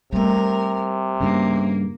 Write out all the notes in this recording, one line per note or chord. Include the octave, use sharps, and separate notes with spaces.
C3 G3 A3 A#4
G2 C#3 A#3